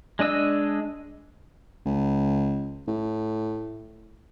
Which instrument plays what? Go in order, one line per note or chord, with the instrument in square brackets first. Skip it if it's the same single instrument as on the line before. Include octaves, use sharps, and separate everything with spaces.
[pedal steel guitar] G#3 D4 D#5 E6
[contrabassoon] C#2
A2